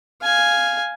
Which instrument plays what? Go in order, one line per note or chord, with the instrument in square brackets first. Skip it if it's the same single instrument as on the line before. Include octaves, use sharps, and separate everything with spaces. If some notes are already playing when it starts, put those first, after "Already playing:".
[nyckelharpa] F5 G#5